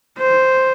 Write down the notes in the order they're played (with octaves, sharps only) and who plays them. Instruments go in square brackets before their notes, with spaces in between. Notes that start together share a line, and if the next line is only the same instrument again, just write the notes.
[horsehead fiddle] C5